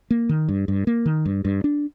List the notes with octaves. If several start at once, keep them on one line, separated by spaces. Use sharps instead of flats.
A#3
D#3
G2
G2
A#3
D#3
G2
G2
D4